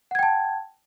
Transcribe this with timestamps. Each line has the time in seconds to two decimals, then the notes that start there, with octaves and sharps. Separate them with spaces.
0.11 F#5
0.15 G#6
0.19 G5
0.23 A5